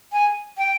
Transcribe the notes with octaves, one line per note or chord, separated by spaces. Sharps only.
G#5
G5